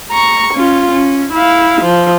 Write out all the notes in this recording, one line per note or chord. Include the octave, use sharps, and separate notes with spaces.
A#5 C#6
C#4 F4
C#4
E4 F5
F3